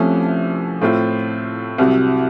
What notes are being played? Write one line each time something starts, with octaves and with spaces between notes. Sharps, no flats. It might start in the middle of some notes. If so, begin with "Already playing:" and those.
Already playing: C2 C3 F3 A3 C#4
A2 A3 C4 F4
C2 C3 F#3